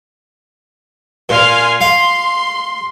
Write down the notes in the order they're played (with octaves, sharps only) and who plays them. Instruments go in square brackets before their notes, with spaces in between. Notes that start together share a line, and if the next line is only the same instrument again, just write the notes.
[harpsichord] A#2 [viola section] F5 G#5 C6
[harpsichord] F5 [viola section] C6